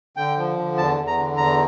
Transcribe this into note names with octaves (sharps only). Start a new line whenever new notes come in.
D3 G5
F3
D3
E2 A5
E2
A#5
D3
E2 A#5